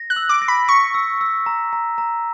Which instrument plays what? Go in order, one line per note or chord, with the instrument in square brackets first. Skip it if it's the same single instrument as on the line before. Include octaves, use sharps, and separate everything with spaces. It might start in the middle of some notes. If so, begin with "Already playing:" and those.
Already playing: [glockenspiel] A#6
[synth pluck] F#6
[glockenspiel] E6
[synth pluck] D6
[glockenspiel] A#6
[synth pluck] B5
[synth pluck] C#6 [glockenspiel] B6
[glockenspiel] E6
E6
A#5
A#5
A#5